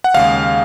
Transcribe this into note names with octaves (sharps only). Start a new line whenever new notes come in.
F#5
D#2 C#3 G#3 F5